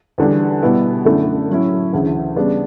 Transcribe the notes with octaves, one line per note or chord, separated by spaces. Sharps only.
E2 D3 G3 D4
B2 G3 B3 E4
F#2 D3 A3 E4
A2 F#3 C#4 E4
D2 C#3 E3
C#3 G3 B3 D4